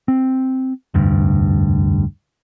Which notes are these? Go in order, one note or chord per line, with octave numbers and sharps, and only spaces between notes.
C4
F1 D2 G2